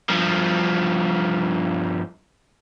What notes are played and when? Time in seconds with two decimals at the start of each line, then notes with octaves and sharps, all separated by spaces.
0.09 G2 F3